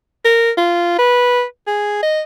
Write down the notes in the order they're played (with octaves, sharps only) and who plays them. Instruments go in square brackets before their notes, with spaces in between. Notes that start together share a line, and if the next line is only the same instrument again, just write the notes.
[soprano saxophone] A#4
F4
B4
G#4
D#5